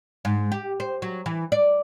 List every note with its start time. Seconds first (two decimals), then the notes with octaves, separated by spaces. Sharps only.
0.25 G#2
0.52 G4
0.80 C5
1.02 F#3
1.26 E3
1.52 D5